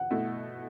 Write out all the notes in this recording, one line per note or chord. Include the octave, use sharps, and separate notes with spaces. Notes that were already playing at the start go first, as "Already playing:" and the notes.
Already playing: F#5
B2 A3 E4